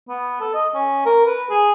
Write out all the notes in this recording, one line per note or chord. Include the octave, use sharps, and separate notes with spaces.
B3
A4
D#5
C#4
A#4
B4
G#4